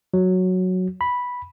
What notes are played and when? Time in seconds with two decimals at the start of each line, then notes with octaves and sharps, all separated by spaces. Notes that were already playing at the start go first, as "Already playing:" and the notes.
0.14 F#3
1.01 B5